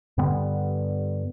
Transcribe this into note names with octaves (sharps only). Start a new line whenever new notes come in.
G2 D3 G3 B3